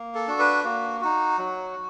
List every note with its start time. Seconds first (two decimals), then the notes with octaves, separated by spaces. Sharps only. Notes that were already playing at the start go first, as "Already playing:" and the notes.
Already playing: A#3
0.15 A4
0.27 D4 F#4
0.39 B4
0.64 A#3 F#4
1.01 D#4 F#4
1.38 F#3